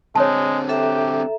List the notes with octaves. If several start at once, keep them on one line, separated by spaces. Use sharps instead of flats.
D3 G#3 C4 C#5 A5
G4 A4 E5 A#5